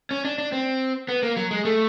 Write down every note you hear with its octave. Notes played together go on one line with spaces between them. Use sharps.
C#4
D4
D4
C4
B3
A#3
F#3
G#3
A3